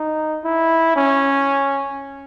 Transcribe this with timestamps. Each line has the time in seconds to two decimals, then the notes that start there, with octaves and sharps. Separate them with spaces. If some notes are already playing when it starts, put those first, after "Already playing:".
Already playing: D#4
0.44 E4
0.96 C#4